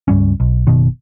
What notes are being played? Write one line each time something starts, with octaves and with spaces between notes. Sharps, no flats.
C#2 G2 G3 C#4
B1
F#1 B2 D#3